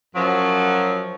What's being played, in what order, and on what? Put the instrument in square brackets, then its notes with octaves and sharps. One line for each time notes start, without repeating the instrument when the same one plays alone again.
[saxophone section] F#2 F3 F#3